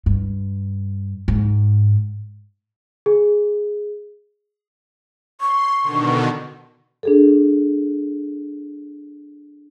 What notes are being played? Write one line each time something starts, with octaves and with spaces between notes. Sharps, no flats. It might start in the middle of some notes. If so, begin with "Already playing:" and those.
G2
G#2
G#4
C6 C#6
B2 D3 D#3
D4 G#4 A4